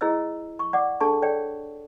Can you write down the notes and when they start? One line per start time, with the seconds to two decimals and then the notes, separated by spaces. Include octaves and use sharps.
0.01 E4 G#4 C5 D#5 E6
0.59 C#6
0.73 D5 F#5 D6
1.00 D4 G#4 A4 A5 C#6
1.22 A4 C#5 D5 G5